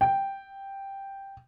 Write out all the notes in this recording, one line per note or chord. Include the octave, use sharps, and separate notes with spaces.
G5